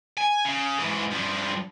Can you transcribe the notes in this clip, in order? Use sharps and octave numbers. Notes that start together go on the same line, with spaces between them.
G#5
C#3
G#2 E3
G2 F3